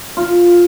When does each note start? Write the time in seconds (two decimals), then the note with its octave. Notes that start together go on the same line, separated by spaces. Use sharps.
0.17 F4